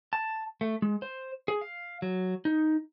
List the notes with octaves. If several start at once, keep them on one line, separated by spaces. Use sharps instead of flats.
A5
A3
G#3
C5
G#4
F5
F#3
D#4